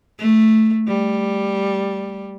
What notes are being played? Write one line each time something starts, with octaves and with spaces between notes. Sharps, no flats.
A3
G3